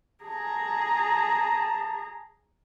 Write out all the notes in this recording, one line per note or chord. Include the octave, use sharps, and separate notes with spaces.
G#4 A5 A#5